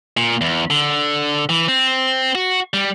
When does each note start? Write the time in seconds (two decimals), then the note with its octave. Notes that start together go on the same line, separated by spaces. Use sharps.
0.17 A#2
0.41 E2
0.70 D3
1.49 E3
1.68 C4
2.35 F#4
2.74 G3